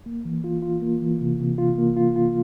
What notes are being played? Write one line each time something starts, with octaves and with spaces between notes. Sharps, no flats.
A#3
E3
F4
F4
A#3
E3
C3
C3
F4
A#3
F4
F4